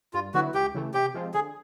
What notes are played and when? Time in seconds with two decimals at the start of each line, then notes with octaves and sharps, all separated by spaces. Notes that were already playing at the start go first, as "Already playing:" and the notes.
0.14 G2 F4
0.34 D3 F#3 B3 E4 F#4
0.54 C#2 G4
0.75 C#3 E3 A3
0.94 C3 G4
1.14 F3 G#3 C4 F4
1.34 D3 G#4